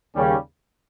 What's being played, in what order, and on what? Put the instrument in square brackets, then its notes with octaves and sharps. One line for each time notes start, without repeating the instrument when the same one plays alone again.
[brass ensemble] D#2 C#3 G3 C#4